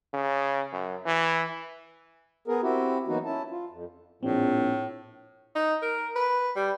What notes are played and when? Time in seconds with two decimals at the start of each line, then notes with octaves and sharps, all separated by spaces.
0.14 C#3
0.73 F#2
1.06 E3
2.48 B3 G#4 A#4
2.62 C4 E4 F#4 G4
3.08 E3 F#3 A#3 B3 D#4 F#4
3.25 C#4 E4 A5
3.51 F4
3.69 F2
4.23 A#1 A2 C4
5.55 D#4
5.82 A#4
6.16 B4
6.56 G3